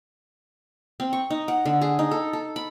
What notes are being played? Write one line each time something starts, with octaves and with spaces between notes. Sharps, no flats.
C4
C#6
D#4
F#5
D3
G#4
D#4
A4
A4
B5